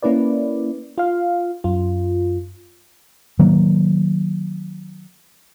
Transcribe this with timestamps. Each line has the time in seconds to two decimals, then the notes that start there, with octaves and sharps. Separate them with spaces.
0.02 A#3 C#4 E4 B4 D5
0.98 F4 F5
1.64 F#2 F4
3.39 D#3 F#3 A#3